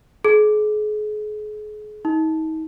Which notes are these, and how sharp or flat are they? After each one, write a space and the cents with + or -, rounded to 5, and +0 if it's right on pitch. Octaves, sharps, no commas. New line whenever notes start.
G#4 +35
D#4 +35